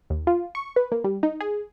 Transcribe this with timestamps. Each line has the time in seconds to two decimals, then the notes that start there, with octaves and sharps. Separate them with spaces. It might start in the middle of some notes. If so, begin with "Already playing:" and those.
0.10 D#2
0.27 F4
0.55 C#6
0.76 B4
0.92 A#3
1.04 G3
1.23 D#4
1.41 G#4